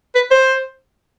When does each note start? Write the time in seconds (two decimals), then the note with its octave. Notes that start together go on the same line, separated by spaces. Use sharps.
0.15 B4
0.31 C5